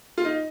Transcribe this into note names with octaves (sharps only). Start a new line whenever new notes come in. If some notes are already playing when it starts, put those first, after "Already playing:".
F4
D#4